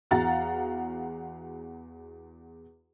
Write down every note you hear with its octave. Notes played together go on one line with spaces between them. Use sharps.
E2 F#4 F5 F#5 A#5 A6